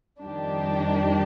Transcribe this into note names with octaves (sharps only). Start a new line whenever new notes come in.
F2 D#3 G3 D4 G4